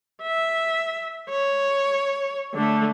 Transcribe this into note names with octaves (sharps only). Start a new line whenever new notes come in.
E5
C#5
D3 A3